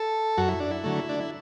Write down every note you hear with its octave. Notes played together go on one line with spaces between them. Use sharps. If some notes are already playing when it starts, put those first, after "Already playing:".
Already playing: A4
F#2 F#4
E4
D4
E4
D3 F#3 A3
D4
E4